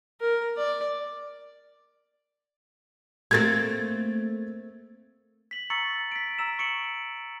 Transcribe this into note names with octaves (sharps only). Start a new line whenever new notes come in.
A#4
D5
A3 A#3 C4 G#6 A6
B6 F#7
A#5 C#6 E6 A6 C#7 F#7
B6 D7
A#5 E6 E7
C#6 C#7 D7 F#7